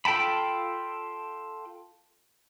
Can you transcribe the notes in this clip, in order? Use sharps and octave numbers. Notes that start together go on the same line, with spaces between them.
F4 A4 G5 A5 B5